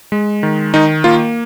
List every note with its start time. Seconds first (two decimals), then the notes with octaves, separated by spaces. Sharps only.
0.12 G#3
0.43 D#3
0.74 D#3 D#4
1.04 A#3 F4